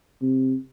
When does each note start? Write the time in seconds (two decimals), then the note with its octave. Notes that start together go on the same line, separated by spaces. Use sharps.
0.22 C3